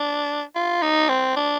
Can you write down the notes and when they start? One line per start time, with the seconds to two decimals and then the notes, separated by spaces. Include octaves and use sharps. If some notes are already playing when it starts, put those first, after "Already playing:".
Already playing: D4
0.55 F4
0.82 D#4
1.09 C4
1.36 D4